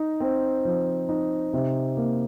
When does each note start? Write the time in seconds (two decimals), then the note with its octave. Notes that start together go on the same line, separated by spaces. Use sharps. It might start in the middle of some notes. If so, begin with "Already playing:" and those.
Already playing: D#4
0.20 C4
0.65 F3
1.09 D#4
1.53 C3
1.97 A#3